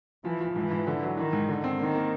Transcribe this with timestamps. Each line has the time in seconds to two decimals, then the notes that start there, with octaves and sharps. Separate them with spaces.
0.25 E3 F3
0.40 F3
0.56 G#2 E3
0.71 G#2
0.87 D3
1.02 F#3
1.17 D#3 E3
1.33 G#2
1.48 D3
1.64 C4
1.80 D#3 A#3
1.95 A#3